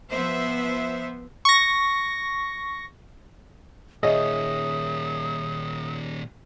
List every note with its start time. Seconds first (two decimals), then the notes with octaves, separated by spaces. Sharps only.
0.10 F3 B3 C5 E5
1.45 C#6 A#6
4.03 A#2 D#3 G#4 C#5 D#5 E5 D#6